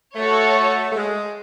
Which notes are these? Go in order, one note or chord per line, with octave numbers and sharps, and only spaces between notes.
A3 F#4 A4 C#5
A3
G#3